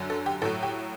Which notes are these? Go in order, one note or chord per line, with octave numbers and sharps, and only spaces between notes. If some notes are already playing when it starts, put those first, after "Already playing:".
Already playing: F#2 D3 F#3
A4
G4
A2 F#3 A4
G4